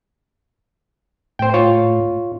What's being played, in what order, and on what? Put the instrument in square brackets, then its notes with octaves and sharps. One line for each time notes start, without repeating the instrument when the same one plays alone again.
[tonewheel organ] A2 [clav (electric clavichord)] C5 G5
[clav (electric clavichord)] F4 C#5